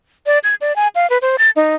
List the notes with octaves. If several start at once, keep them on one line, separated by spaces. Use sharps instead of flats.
D5
G#6
D5
G#5
F5
B4
C5
A6
D#4